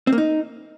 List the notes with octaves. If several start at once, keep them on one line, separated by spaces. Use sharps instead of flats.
C4
A#3
D#4